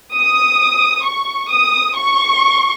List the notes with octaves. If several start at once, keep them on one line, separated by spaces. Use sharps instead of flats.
D#6
C#6
D#6
C#6